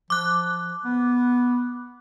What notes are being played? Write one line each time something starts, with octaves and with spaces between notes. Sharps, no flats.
F3 D6 F#6
B3